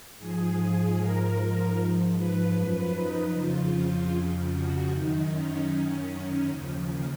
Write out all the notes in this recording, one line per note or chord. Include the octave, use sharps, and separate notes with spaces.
G#2 F3 G#4
G#4
G#2 F3 A#4
G#2 F3
B4
F#2 F3
D#4
F2 C#3 F3 F4
F2 C#3 F3
F#4
F#2 D#3 D#4
C#4
F#2 D#3
D#2 C#3 F3